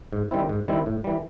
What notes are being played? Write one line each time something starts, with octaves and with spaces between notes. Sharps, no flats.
G#2
D#3 G3 C4 E4
G#2
D#3 G3 C4 E4
A2
E3 G3